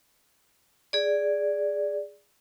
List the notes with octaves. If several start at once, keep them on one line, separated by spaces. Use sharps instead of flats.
G#4 D5